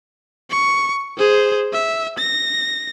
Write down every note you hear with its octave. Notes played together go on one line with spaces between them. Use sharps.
C#6
G#4 C5
E5
A#6